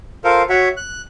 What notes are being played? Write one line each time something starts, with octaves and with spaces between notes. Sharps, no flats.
F4 A4 A#4 C5 F5
F#4 C#5 E5 F#5
F#6